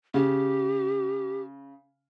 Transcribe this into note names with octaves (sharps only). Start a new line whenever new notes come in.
C#3 G4